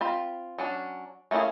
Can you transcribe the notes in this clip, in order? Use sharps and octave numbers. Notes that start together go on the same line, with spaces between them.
C4 F4 B5
F#3 C#4 D4
A3 A#3 C#4 E4 G#4